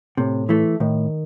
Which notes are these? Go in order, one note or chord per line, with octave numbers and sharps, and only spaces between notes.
A2 C3
E3 A3
A2 D#3